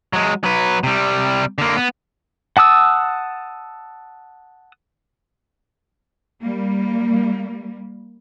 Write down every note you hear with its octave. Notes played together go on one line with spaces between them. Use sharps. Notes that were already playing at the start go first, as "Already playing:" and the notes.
F#3 G#3
F#3 B4
C3 G3
D3 A#3
B3
F#5 A5 D#6 E6
G3 A#3